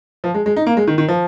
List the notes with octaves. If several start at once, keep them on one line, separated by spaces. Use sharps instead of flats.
F3
G#3
G#3
D#4
A#3
G#3
D#3
D#3
F3